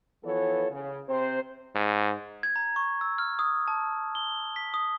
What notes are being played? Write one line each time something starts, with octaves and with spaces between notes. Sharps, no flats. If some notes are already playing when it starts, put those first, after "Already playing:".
E3 F3 B3 A4 C#5
C#3
C3 C4 C5
G#2
G#6
A#5
C#6
E6
F6
D#6
A5
G7
B6
D#6